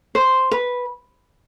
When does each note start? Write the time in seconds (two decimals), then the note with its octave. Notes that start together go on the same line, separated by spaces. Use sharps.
0.15 C5
0.52 B4